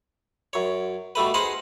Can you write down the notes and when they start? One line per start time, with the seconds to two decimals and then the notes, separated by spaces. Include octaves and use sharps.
0.53 F#2 C#5
1.15 B2 G3 A3 B4
1.34 D#4 G#4 B4 C5 F5 F#5